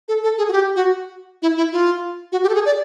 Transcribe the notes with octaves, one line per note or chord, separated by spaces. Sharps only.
A4
A4
G#4
F#4
G4
F#4
E4
E4
F4
F#4
G4
A4
G#4
D5